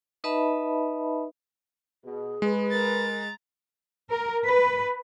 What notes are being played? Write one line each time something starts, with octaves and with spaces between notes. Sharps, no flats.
D#4 B4 D#5 E5 A5 B5
B2 G#4
G#3 B4
A#4 A#5 A6
A#4
B4